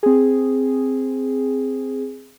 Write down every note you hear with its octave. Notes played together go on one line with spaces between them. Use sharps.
C4 G#4